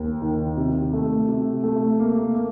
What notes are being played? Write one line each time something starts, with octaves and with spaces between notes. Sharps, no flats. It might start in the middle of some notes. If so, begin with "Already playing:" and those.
Already playing: D#2
D#3
C3
A3
C3
A3
A#3
A#3